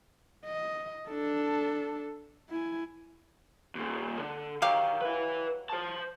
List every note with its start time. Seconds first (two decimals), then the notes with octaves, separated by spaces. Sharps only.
0.45 D#5
1.08 D4 A4
2.50 E4 G#5
3.75 D#2 A#2
4.19 D3
4.62 D#3 F#3 G4 F5
5.01 B4 E5
5.70 C5 A5